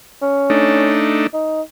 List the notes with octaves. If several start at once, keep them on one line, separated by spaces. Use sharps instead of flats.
C#4
A3 D4 D#4
D#4